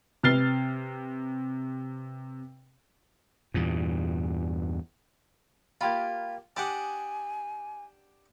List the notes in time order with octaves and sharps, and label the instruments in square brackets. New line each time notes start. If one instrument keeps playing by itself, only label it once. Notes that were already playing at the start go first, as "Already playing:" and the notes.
[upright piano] C3 B4 F6 A6 C7 G7
[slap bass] E2 G2 A#2
[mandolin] A#3 G4 B5 [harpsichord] F4
[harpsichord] D4 G4 F#5 [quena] G#5 [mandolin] D6 D#6